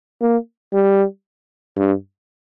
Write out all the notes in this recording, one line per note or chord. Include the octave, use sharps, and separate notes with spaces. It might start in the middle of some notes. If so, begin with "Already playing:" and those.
A#3
G3
G2